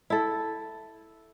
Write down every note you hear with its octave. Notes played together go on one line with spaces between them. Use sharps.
E4 A4